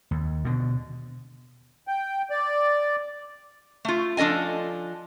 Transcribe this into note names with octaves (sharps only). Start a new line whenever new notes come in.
D#2
B2 D3
G5
D5
A3 F4
F3 D4 A4 D#5 G#5